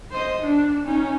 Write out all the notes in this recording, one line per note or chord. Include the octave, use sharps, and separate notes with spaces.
C5 D#5
D4
C#4 D#4